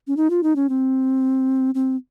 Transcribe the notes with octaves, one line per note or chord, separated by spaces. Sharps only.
C#4
D#4
F4
D#4
C#4
C4
C4